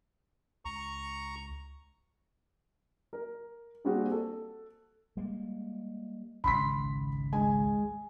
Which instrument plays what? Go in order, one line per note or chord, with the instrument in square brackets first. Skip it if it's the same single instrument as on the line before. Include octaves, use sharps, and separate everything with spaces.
[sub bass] C#2 [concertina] A#5 C#6
[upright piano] A#4
G3 A#3 C4 D4 F#4 G#4
A4
[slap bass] G3 G#3 A#3
[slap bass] G#1 C#2 [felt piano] B5 C6 B6
[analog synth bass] G#3 [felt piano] G#5